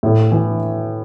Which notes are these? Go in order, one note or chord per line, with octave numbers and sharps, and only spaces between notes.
A2
E3